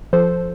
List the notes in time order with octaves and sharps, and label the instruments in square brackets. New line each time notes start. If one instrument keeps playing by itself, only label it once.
[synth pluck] F3 A4 C5